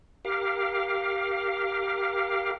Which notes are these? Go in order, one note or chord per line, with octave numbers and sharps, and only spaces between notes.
G4 A#4 F5